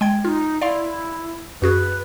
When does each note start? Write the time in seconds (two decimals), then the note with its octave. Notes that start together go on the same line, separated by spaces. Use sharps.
0.01 G#3 G5 G#6
0.25 D#4 F4
0.61 E4 D5 F5 C6
1.62 F#2 F#4 G#4 B4